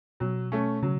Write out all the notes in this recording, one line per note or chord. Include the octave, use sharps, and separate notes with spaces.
B2 F#3
A3 C#4
C#3 F#3